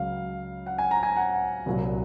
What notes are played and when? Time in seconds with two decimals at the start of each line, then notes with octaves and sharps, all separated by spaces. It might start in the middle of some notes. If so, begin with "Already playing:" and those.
Already playing: C#2 C#3 F#3 F5
0.66 F#5
0.78 G#5
0.91 A#5
1.03 G#5
1.17 F#5
1.66 C2 A#2 F#3